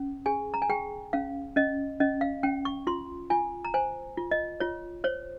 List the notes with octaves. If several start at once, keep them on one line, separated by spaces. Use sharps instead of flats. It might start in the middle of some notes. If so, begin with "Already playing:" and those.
Already playing: C#4
G#4 G#5
A#5
G#5
G#4 G5
C#4 F5
C#4 D#5
C#4 D#5
F5
C#4 G5
C#6
F4 C6
F4 G#5
A#5
C5 G#5
F4
D#5
F4 C#5
C5 C#5